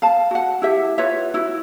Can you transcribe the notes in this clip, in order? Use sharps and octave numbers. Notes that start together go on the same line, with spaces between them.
F5 A5
F#4 F#5
E4 G4 E5
F4 B4 C#5 E5
E4 F#4